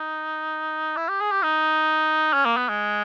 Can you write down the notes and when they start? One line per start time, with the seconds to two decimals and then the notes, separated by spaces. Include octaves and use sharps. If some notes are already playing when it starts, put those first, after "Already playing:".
Already playing: D#4
0.97 E4
1.09 G4
1.20 G#4
1.31 G4
1.43 D#4
2.33 C#4
2.45 A#3
2.57 B3
2.69 G#3